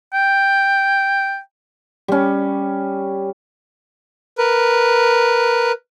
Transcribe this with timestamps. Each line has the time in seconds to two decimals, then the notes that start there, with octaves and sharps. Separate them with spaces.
0.13 G5
2.08 G3 C#4
4.38 A#4 B4